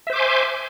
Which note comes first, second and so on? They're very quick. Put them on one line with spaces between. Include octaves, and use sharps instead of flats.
E5 C5 D6 C6 G#5